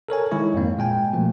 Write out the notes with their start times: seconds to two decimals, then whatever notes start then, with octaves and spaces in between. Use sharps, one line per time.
0.09 A4 A#4 C#5 G#5
0.31 D#3 G#3 E4 C#5
0.54 F2 G#2 A#3
0.78 A#2 G#3 G5 G#5
1.13 B2 F3 A3 A#3